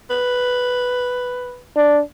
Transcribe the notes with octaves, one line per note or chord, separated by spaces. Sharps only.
B4
D4